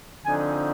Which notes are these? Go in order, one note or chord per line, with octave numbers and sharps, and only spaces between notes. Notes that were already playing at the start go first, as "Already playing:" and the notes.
D3 F3 C4 D#4 G#5